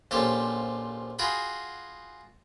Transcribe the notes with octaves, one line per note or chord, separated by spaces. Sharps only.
A#1 F3 C#4 G4 A4
F4 F#4 G#4 G5 B5